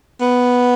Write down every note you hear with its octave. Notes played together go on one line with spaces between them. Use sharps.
B3